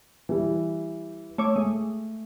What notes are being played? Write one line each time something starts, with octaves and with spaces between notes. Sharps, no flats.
E3 G3
A3 C#5 D6
G#3 A3